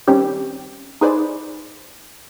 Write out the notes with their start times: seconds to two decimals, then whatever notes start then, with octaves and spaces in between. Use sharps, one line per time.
0.07 D#3 G3 C4 C#4 G4
1.01 D#4 G#4 B4 C5 D5